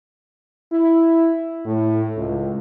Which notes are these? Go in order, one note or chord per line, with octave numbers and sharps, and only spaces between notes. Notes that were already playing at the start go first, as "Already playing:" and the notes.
E4
A2
C#2